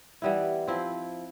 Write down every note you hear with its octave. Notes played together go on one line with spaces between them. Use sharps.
E3 G3 B3 E4
F3 C4 E4